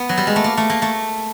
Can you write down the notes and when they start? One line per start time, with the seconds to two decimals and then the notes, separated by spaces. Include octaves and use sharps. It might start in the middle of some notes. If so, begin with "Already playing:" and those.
Already playing: B3
0.09 F#3
0.18 G3
0.27 G#3
0.36 A3
0.44 A#3
0.57 A3
0.70 A#3
0.82 A3